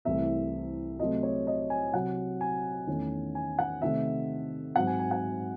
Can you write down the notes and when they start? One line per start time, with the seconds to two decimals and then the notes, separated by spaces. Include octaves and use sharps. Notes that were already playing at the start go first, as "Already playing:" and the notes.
0.05 C2 C3 E3 A3 C4 E5
0.99 C3 F#3 A3 C4 D#5
1.23 C#5
1.47 D#5
1.70 G#5
1.93 C3 F#3 C4 F#5
2.41 G#5
2.87 E2 D#3 A3 C#4
3.35 G#5
3.59 F#5
3.81 C3 D#3 A3 C4 E5
4.76 G#2 F#3 C4 F#5
4.87 G#5
4.99 G#5
5.11 F#5